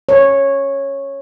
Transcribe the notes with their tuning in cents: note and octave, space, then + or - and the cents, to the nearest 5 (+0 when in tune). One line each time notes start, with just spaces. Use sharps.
C#5 -10